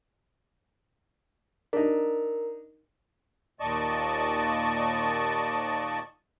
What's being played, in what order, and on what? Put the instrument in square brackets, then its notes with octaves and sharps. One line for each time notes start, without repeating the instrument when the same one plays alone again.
[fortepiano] D4 D#4 [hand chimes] A#4
[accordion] D#2 A#2 D5 D#5 A5 C#6